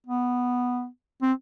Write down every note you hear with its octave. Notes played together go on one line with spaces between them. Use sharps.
B3
C4